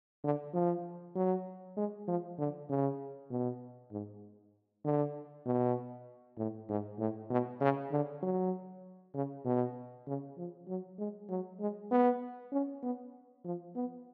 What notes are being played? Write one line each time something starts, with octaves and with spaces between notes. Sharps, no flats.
D3
F3
F#3
G#3
F3
D3
C#3
B2
G#2
D3
B2
A2
G#2
A2
B2
C#3
D3
F#3
C#3
B2
C#3
F3
F#3
G#3
F#3
G#3
B3
C#4
B3
F3
B3